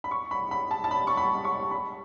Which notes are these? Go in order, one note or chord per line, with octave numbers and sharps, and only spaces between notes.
B5
C#6
B5
B5
A5
A5
B5
C#6
B5
C#6
B5